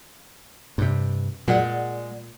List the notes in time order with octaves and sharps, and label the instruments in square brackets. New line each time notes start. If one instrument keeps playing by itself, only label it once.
[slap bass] G2 C3
[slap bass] A#2 [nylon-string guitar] G#3 D5 F#5